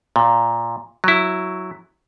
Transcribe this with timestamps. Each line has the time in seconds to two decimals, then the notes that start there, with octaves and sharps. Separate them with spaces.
0.16 A#2
1.04 F#3 E4